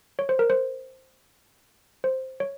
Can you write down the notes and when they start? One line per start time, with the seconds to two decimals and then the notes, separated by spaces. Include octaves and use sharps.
0.19 C#5
0.29 C5
0.39 A#4
0.50 C5
2.04 C5
2.40 C#5